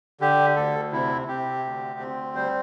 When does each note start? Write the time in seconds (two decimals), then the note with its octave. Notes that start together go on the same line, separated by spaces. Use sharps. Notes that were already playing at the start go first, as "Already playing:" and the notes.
0.20 D3 G4
0.56 D2 A4
0.92 C3 E4
1.28 C3 G4
1.64 D2
1.99 C4
2.35 G3 C5